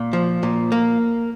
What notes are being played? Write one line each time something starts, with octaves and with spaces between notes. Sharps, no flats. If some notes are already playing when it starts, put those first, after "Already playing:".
Already playing: A#2
F3
A#2
A#3